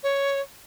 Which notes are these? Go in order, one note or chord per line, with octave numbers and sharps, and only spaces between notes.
C#5